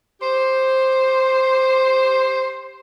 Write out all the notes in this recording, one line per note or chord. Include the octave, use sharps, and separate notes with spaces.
G4 C5